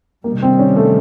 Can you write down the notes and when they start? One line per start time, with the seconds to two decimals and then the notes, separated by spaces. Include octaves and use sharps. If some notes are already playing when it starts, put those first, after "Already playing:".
0.24 C3 D#3 G3 A#3
0.42 C4
0.59 C#4
0.76 A3